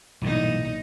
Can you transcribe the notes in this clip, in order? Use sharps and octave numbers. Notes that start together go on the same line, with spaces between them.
B1 G2 A#2 E3 D#4